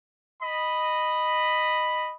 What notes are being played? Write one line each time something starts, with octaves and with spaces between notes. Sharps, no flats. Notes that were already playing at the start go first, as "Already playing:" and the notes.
D#5 B5